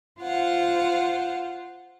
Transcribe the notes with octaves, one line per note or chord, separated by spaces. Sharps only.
F4 C5 F5 F#5